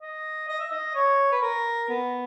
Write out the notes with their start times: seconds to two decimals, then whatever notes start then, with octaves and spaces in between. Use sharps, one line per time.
0.01 D#5
0.49 D#5
0.60 E5
0.71 D#5
0.95 C#5
1.32 B4
1.42 A#4
1.89 B3